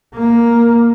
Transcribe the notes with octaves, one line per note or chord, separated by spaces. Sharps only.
A#3